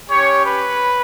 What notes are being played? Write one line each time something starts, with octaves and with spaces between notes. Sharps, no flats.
C#4 G4 C#5
B4